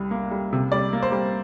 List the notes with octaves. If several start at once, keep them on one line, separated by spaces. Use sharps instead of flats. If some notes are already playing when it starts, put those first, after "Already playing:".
Already playing: C2 G3
A#3
G3
C3
G3 D5
A#3
C5
G3